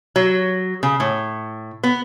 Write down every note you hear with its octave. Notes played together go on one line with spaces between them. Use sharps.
F#3
C#3
A2
B3